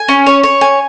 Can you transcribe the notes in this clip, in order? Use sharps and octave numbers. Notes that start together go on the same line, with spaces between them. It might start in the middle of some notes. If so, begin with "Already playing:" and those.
Already playing: G#5
C#4
C#5
C#5
G#5